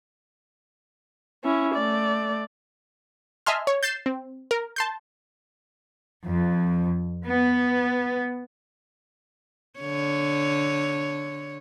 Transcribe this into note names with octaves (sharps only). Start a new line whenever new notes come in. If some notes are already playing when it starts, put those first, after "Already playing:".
C#4 E4
A3 D5
D#5 E5 G#5 A5 C6 F6
C#5
G6 A6 C7 E7
C4
A#4
A5 C6 G6
F2
B3
D3 C#5